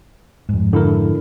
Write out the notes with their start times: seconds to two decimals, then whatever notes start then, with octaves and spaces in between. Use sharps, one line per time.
0.49 F2 G#2
0.73 D3 E4 A#4